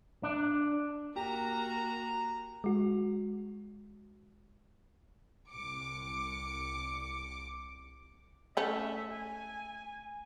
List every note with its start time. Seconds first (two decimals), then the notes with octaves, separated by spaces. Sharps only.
0.23 D4
1.16 A#3 F#4 G4 A#5
2.64 G#3 F#4
5.49 C2 D6 C#7
8.57 A3 C#4 E5
9.11 G#5